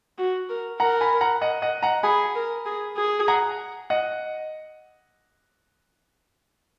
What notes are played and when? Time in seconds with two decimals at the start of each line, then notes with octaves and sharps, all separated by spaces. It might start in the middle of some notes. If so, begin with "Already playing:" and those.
0.18 F#4
0.49 A#4
0.80 A#4 F#5 A#5
1.01 G#5 B5
1.21 F#5 A#5
1.42 D#5 F#5
1.62 D#5 F#5
1.83 F#5 A#5
2.03 G#4 G#5 B5
2.35 A#4
2.66 G#4
2.97 G#4
3.28 F#5 A#5
3.90 D#5 F#5